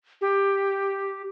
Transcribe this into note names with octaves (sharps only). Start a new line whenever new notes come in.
G4